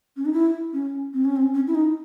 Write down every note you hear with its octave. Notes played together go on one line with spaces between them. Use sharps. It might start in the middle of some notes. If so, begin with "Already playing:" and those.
C#4
D#4
E4
C#4
C4
C#4
C4
C#4
E4
D#4